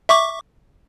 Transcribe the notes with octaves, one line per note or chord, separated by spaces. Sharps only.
E5 C#6 D6